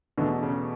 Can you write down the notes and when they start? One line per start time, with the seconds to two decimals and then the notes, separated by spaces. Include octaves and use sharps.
0.18 E2 B2 D3 A3
0.43 C#3